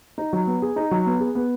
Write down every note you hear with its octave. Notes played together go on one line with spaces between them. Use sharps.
D#4
F#3
B3
G#4
D#4
F#3
B3
G#4
B3